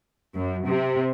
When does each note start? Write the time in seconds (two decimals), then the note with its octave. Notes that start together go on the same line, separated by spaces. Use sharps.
0.35 F#2
0.66 C3